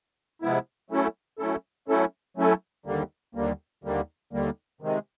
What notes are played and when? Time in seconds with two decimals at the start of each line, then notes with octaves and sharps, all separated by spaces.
0.42 C3 F3 G#3 B3 E4
0.90 F#3 A3 C#4 E4 A4
1.39 F#3 A3 C#4 E4 A4
1.88 F#3 A3 C#4 E4 A4
2.37 F#3 A3 C#4 E4 A4
2.86 D#2 D3 G3 A#3
3.35 D#2 D3 G3 A#3
3.84 D#2 D3 G3 A#3
4.33 D#2 D3 G3 A#3
4.81 C3 D#3 G#3